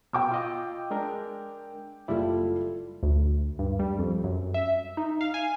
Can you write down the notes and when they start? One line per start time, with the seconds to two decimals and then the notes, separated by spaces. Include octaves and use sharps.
0.13 B2 G5 D6 E6
0.31 F4 D#5
0.91 G#3 D4 A#4
2.08 F#1 G3 E4 F4 A4
3.03 D2
3.59 G2
3.79 G3
3.99 F2
4.24 F#2
4.54 E5
4.97 D#4
5.21 F5
5.34 G#5